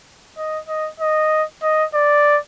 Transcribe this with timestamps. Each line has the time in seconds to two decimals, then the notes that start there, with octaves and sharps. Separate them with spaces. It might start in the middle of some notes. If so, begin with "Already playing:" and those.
0.37 D#5
0.68 D#5
1.00 D#5
1.63 D#5
1.94 D5